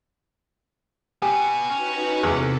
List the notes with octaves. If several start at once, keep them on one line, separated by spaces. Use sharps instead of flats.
B3 F#4 G4 G#5
C#4 D#4 F#4 B4
E2 C3 A4